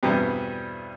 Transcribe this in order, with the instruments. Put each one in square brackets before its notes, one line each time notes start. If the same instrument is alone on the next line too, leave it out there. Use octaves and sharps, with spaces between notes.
[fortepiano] E2 G2 B2 G3 B3 C4